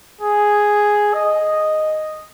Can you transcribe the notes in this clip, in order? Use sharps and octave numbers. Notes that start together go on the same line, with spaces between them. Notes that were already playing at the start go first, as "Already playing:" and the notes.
G#4
D#5